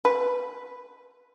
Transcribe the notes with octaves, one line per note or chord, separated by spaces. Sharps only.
B4